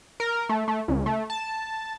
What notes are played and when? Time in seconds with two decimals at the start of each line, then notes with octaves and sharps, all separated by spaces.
0.20 A#4
0.49 A3
0.68 A3
0.88 C#2
1.06 A3
1.30 A5